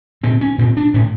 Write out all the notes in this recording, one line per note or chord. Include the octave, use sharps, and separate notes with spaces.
A#2 C4
C#4
A#2 C4
D4
A2 C#4